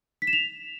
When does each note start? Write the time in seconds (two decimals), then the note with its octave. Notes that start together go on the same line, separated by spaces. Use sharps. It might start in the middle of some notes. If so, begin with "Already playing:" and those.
0.22 B6
0.27 E7
0.33 F7